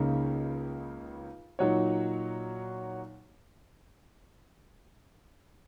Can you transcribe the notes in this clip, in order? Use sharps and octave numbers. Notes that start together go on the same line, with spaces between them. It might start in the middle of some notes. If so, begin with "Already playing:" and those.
Already playing: C#2 C#3 A#3 D#4
A#2 F#3 D#4 F#4 C#5